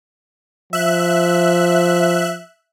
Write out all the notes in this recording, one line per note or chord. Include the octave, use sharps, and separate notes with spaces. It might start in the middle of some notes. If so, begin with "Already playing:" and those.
F3 E5 F#6